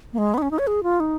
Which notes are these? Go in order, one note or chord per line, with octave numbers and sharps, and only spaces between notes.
A#3
G#3
B3
D#4
C#4
D#4
C#5
G#4
F4
D#4